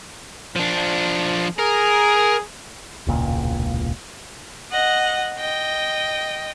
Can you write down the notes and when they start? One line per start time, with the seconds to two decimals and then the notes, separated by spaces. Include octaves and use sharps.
0.56 F3 D4
1.59 G#4 A#4
3.07 E1 C#2 A#2
4.71 D#5 F#5
5.38 D#5 G5